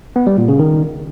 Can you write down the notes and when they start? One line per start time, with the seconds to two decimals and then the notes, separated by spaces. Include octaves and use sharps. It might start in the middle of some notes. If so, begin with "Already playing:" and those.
0.16 B3
0.27 G3
0.38 A#2
0.48 C#3
0.59 D#3